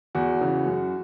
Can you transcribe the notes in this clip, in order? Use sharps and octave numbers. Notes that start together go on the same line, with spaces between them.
E2 F#4
C#3 E3
F#2